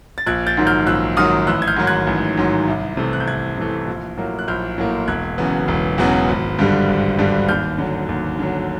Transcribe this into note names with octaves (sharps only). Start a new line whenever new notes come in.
A6
A#1 F#6 G#6
G6 A6
G#2 D#3 F#3
F6 G6
A#1 E6 F#6
G#2 D#3 F#3 D#6 F6
A1 E6 F#6
G#6
F6 G6
G#2 D#3 F#3
F#6 G#6
A1
G#2 D#3 F#3
C2
C3 E3 A3
F#6
G6
C2 F#6 G#6
C3 E3 A3
A#1
A2 F#3 A#3
F#6
A#1 F6 G6
A2 F#3 A#3
E1 F#6 G#6
E2 C#3 F#3 B3
E1
E2 C#3 F#3 B3
G#1
G2 D3 G3
G#1
G2 D3 G3
D#2 F6 G6
D3 F#3
D#2
D3 F#3